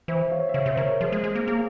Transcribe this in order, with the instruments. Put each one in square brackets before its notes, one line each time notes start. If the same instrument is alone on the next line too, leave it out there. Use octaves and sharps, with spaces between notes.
[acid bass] E3 [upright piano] C5 E5
[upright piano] C#5 F5
E5
[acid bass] C#3 [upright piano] C#5 F5
[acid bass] C3
[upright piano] C5
[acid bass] C#3 [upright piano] A#4 C#5
[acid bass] F3 [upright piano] G#4 C5
[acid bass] G#3
[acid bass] G#3 [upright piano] G#4
[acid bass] A#3
[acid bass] A#3 [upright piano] G#4